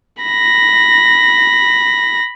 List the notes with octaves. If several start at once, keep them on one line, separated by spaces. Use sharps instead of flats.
B5 A#6